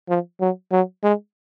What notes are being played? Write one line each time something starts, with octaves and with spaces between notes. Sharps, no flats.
F3
F#3
F#3
G#3